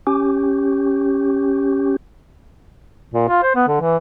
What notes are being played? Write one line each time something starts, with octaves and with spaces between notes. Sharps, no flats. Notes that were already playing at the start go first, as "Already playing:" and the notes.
C#4 G4
A#2
F4
C5
B3
D3
E3